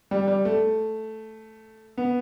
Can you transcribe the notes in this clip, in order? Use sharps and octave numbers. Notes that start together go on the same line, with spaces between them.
G3
G3
A3
B3